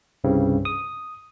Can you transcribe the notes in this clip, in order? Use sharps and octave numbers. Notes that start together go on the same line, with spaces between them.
C2 G2 C#3 C4
D#6